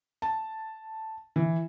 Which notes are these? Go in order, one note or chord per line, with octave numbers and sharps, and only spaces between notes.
A5
E3